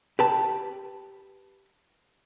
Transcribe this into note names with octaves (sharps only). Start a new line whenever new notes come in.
G4 B4 A5